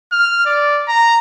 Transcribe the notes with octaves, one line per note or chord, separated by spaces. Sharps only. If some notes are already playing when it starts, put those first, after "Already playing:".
F6
D5
A#5